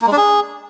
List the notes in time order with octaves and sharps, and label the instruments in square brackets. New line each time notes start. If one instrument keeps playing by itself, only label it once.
[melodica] A#3
G#3
D4
G#4